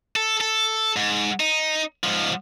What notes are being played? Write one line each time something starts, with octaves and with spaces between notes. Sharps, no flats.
A4
A4
G#2
D#4
G#2 F3